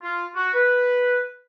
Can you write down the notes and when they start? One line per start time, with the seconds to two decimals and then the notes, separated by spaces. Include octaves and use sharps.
0.02 F4
0.35 F#4
0.53 B4